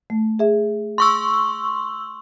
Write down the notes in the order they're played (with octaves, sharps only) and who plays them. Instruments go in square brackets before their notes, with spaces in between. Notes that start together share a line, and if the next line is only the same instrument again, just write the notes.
[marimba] A3
G#4 E5
[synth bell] C6 C#6 E6